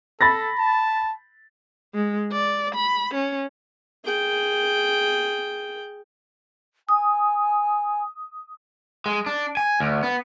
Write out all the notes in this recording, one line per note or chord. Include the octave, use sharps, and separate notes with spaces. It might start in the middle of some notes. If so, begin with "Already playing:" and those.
A4 B5 A6 A#6
A5
G#3
D5
B5
C#4
G#4 G5
G#5 D#6
G#3
D4
G#5
D2
B3